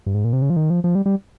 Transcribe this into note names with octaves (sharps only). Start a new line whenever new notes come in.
G2
G#2
A#2
C3
C#3
F3
D#3
F3
F3
G3
G3